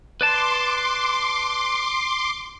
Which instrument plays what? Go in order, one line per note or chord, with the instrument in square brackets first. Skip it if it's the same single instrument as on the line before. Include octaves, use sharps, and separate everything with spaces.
[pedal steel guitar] B4 D5 A5 [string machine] C6 D6